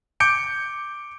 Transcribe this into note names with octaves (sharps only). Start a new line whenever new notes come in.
D6 G6 C#7 D7